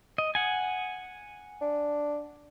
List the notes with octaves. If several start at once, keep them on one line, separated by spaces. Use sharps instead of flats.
D#5
F#5 G#5
D4